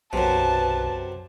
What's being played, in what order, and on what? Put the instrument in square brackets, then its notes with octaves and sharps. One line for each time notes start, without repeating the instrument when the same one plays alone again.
[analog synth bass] B1 [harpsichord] F#2 C3 [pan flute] B4 [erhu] A5